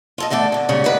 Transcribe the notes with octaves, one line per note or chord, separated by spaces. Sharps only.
F4 A4 D#5
E2 D3 A3 A4 D5
D2 D3
D#2 G#2 C#3 G3 F#4
A2 D3 D#3 B4